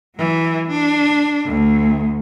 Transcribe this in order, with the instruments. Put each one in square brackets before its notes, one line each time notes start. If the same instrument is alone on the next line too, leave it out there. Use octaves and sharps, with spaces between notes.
[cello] E3 F#3
D4
D2